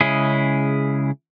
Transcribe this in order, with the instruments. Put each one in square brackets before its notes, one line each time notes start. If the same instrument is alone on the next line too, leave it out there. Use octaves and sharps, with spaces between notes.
[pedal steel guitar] C#3 G#3 C#4 E4 G#4